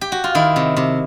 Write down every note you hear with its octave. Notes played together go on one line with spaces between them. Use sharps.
G4
F#4
F4
D#3 E4
C3
C3